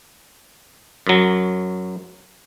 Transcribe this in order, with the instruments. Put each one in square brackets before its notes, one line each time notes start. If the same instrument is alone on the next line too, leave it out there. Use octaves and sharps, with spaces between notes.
[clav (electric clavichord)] F#2 F#3